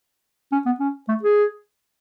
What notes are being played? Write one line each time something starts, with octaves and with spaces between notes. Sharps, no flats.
C#4
B3
C#4
A3
G#4